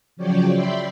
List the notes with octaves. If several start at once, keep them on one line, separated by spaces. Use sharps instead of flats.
C#3 F3 F#3 C#5 D5 G5
D5 E5 G5 B5 C6